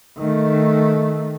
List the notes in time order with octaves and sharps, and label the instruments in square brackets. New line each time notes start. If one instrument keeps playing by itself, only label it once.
[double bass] D#3 A3